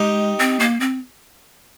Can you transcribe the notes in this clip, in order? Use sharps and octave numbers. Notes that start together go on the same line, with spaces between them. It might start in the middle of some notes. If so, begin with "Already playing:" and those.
Already playing: G#3 D#4 G4
C4
A#3
C4